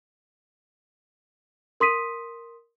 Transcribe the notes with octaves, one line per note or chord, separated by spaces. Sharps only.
A#4 C6 D#6 B6 D#7